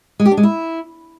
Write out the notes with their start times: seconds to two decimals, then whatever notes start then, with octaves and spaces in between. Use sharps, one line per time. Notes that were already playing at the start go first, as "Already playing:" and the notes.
0.20 G#3
0.25 G4
0.31 D4
0.37 G#3
0.43 E4